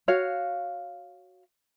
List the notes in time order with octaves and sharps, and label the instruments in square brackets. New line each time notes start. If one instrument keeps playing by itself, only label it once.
[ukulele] F#4 C#5 F5